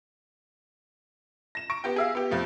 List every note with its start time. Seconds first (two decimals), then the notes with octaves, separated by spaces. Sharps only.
1.55 A#6 E7
1.70 C#6 A#6 D7
1.84 B3 G4 G5
1.96 G#4 E5 F5
2.15 B3 G4
2.31 F2 F3 A3